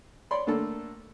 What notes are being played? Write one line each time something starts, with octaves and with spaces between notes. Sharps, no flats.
C#5 D5 B5 C6
D3 A3 A#3 A4